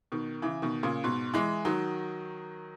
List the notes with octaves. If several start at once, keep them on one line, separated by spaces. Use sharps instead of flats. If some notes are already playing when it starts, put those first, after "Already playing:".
B2 D#3
C#3 E3
B2 D#3
A#2 C#3
G#2 B2
E3 G#3
D#3 F#3